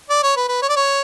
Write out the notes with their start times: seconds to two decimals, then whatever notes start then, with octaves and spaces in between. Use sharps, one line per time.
0.09 D5
0.23 C#5
0.36 B4
0.48 B4
0.62 C#5
0.69 D5
0.76 C#5